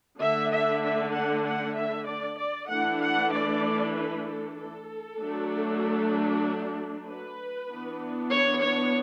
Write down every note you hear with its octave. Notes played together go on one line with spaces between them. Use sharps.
D3 A3 D4 E5
E5
E5
F#5
F#5
E5
D5
D5
E3 A3 D4 F#5
F#5
D5
B4
A4
A4
F#3 A3 D4
B4
E3 B3 D4
C#5
C#5